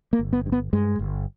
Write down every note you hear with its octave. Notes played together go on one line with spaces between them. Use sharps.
A#3
G1
B3
G2
B3
G2 G#3
G1